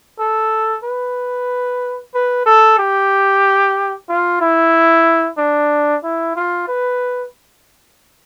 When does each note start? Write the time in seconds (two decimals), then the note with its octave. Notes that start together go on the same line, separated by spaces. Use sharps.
0.19 A4
0.84 B4
2.15 B4
2.46 A4
2.78 G4
4.09 F4
4.41 E4
5.38 D4
6.04 E4
6.36 F4
6.68 B4